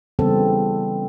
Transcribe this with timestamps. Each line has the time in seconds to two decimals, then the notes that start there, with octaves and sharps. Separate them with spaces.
0.19 C#3 E3 G3 B3 C4 A4